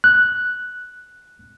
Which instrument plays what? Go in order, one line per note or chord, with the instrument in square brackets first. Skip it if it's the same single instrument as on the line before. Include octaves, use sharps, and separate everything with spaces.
[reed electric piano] F#6